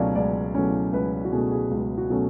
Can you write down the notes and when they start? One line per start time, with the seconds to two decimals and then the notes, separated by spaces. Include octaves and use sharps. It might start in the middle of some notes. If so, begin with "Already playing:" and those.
Already playing: C#2 B2 F#3 A3 C#4 D5 F5
0.15 C#2 D5
0.55 B2 F#3 A3 C#4
0.93 C#2 B4
1.25 F#4
1.32 B2 F#3 A3 C#4 G#4
1.51 G#4
1.71 C#2
1.97 F#4
2.10 B2 F#3 A3 C#4